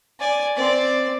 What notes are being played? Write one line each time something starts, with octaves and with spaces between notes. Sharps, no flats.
D5 G#5
C4 D5